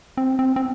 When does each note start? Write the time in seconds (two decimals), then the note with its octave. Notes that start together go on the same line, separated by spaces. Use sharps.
0.17 C4
0.39 C4
0.56 C4